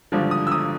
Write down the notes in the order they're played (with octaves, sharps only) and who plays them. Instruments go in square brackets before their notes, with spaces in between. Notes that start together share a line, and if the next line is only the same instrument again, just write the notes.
[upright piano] G#1 G2 D3 F3
D#6
E6
D#6